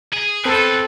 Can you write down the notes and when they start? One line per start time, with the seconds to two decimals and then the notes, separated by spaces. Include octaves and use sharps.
0.13 G#4
0.45 E2 C4 A4 B4